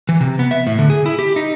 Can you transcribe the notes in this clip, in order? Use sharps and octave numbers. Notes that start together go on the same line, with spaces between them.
E3
C3
B3
E5
A2
D3
G#4
E4
G4
D#4